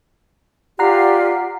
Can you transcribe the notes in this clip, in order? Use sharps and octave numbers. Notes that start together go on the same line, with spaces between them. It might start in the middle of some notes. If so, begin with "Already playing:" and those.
F4 G4 D5 F#5 A#5 C7